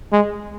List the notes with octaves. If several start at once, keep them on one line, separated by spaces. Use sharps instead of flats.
G#3